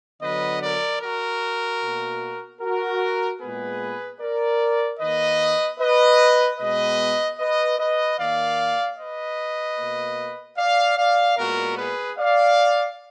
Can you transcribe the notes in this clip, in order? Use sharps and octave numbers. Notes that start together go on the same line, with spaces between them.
D3 F#3 B3 B4 D#5
A#4 D5
F#4 A#4
B2 A#3
F#4 A#4
A#2 G#3 B3 G#4 B4
A#4 D5
D#3 A#3 B4 D#5
B4 D#5
B2 G#3 B3 B4 D#5
B4 D#5
B4 D#5
D#3 A#3 D5 F5
B4 D#5
B2 A#3
D5 F5
D5 F5
A#2 G#3 B3 F#4 A#4
G#4 B4
D5 F5